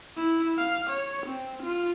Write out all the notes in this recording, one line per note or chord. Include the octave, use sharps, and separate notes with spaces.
E4
F5
C#5
C4
F4